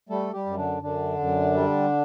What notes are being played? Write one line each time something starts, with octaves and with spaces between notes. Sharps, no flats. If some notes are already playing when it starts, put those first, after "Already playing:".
G3 A3 A4
G3 G4
F#2
D3 D4
F#2 D3 D4
F#2
G3